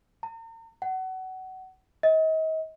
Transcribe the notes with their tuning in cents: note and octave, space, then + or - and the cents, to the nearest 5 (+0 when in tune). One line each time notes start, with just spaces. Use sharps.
A#5 -40
F#5 +25
D#5 +35